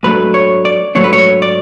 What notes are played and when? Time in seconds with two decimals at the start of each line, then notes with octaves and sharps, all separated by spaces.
0.03 G#2 F#3 A3 D4 B4
0.34 C#5
0.65 D5
0.95 G#2 F#3 A3 D4 C#5
1.04 B4
1.13 C#5
1.42 D5